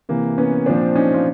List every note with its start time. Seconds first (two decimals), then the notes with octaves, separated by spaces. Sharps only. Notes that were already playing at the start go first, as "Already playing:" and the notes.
0.09 C3 E3 A#3
0.38 B3 C#4
0.66 A#2 F3 C4 D4
0.96 C#4 D#4
1.14 F4